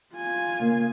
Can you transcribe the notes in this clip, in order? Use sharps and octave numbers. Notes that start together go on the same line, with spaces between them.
F4 G#5
C#3 A#3